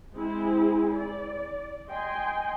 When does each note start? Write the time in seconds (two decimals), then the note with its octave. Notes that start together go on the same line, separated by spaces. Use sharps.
0.13 G#3 C4 E4 G#4
0.95 D5
1.88 D#5 G5 G#5 C6